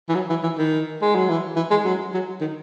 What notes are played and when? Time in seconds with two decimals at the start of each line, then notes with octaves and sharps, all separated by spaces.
0.09 E3
0.15 F#3
0.30 E3
0.43 E3
0.58 D#3
1.02 G#3
1.15 F#3
1.29 E3
1.56 E3
1.71 G#3
1.85 F#3
2.14 F#3
2.41 D#3